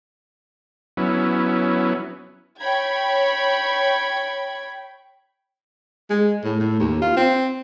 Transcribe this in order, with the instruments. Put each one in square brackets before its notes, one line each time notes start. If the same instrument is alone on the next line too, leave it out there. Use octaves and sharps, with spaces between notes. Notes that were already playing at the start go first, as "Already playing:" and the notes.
[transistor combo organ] F#3 B3 C#4 E4
[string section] C#5 G5 B5 G#6
[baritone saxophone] G#3
A2
A2
D#2
F4
C4